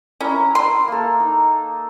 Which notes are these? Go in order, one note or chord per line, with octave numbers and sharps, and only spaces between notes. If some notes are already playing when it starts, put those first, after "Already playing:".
C#4 E4 A#4
C6
A#3 A4
D#4